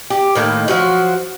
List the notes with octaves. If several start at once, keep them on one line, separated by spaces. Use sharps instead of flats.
G4
A2 D#3 A#3
F3 F#3 F#4